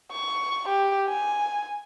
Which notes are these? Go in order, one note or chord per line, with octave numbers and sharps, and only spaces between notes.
C#6
G4
G#5